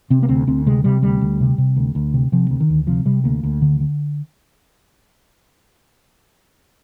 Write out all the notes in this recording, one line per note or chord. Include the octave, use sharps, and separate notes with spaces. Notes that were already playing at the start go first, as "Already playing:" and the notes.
C3 C4
A#3
D2 C4
D2 C4
C3 G#3
C3 G3
D2 G3
D2
C3
C3
D2
D2
C3
C3 F3
D2
D#3
D2
C3 F3
C3 G3
D2 A#3
D2
D3
D3